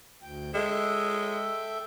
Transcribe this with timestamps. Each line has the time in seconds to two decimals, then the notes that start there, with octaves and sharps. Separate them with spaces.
0.22 D2 G5
0.54 G#3 A4 E5 G5